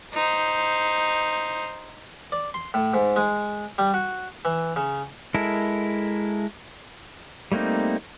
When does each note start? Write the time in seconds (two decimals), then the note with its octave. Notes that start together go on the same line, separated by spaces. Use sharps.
0.13 D#4 C5
2.32 D5
2.54 C6
2.74 A2
2.94 G#2
3.16 G#3
3.78 G3
3.94 F#4
4.45 E3
4.76 C#3
5.34 G#3 E4 A4 A#4
7.52 G3 A3 A#3 C4 D#4